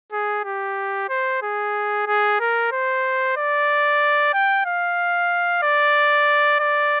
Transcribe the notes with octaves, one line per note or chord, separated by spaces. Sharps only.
G#4
G4
C5
G#4
G#4
A#4
C5
D5
G5
F5
D5
D5